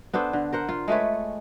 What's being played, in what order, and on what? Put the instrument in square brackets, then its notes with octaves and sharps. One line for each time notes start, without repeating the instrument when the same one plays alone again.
[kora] B3 D4 A4 C5
D3
A#4 C5 F#5
F4
G#3 A3 B4 C#5